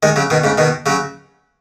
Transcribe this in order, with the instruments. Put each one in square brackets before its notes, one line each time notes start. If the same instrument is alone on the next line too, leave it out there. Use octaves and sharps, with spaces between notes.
[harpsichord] D#3 G#3
C#3 F#3
B2 D#3
G#2 C#3
B2 D#3
C#3 F#3